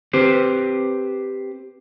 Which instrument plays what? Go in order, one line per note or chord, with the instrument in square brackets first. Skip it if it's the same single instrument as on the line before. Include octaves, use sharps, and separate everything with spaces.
[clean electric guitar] C4 G4 B4 C5